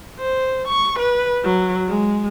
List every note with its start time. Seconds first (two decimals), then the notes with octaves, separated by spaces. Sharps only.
0.19 C5
0.68 C#6
0.99 B4
1.44 F#3
1.88 G#3